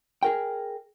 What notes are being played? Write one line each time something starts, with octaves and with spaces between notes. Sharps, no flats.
G#4 A#4 G5